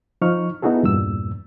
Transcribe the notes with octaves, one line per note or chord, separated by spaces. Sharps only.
F3 D#4 C#6 F6
B3 D#4 E4 F#4 G#4 A4
E2 G2 A#2 E6